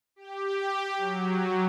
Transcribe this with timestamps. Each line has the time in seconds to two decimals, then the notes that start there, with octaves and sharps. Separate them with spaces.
0.16 G4
0.98 F#3